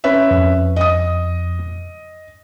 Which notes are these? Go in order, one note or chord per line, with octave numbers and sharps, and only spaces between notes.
C#4 B4 E5
F2
D#5 D#6